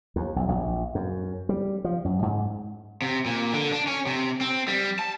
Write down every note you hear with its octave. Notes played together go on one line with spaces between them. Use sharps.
D#2
B1
A#1
F#2
G3
F3
F#2
G#2
C3
A#2
D3
D4
C#4
C3
C4
G3
A5